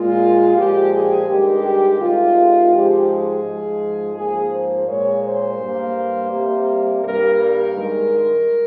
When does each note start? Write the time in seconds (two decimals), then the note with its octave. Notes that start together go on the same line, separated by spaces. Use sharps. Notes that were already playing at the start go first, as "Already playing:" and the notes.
Already playing: A#2 G#3 F4
0.56 A#2 F3 G#3 G4
0.93 G#4
1.28 G2 D#3 G#3 G4
1.99 C3 D#3 G#3 F4
2.72 G#2 F3 G#3 G4
3.08 G#4
3.44 G#2 F3 G#3
4.15 G#2 F3 A#3 G#4
4.51 C5
4.87 A#2 G#3 C#5
5.23 C5
5.58 G2 G3 A#3
6.30 C3 G3 A#3
7.02 G2 G3 A#3 A#4
7.39 A#4
7.75 G2 D#3 G#3